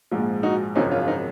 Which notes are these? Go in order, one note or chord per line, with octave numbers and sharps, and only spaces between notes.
A#1 G#2 F3
D#4 F#4
G#1 F#2 C#3 F3 C4 D#4
C#4 F4
F4
C4 D#4